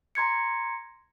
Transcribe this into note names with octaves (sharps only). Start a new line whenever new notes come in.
A#5 C6 G#6 C#7